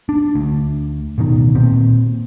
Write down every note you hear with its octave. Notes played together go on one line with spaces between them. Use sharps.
D4
D2
D1 B2 D#3
A#2 C4